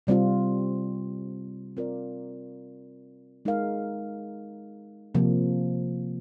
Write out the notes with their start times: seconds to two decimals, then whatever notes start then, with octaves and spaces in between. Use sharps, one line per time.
0.07 C3 G3 C4 F4
1.77 C4 F4 A#4 D5
3.45 G#3 D#4 A#4 F5
5.15 C3 F3 A#3